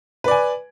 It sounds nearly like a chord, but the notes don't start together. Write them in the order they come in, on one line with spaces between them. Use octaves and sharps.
B4 D5 G#5